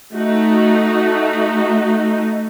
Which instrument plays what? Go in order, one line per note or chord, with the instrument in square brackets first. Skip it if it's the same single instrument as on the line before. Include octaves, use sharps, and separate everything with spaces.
[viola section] A3 D#4 F#4